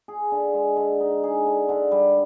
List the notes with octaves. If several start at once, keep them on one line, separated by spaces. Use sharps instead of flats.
G#4
D3
G#3
D3
D#4
G#4
D3
D3
G3